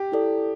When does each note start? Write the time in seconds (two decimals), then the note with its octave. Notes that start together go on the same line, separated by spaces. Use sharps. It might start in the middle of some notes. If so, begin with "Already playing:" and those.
Already playing: G4
0.12 E4 A4 D5